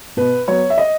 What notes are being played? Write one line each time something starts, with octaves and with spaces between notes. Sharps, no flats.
B2 B4
F#3 B3 C#5
E5
D#5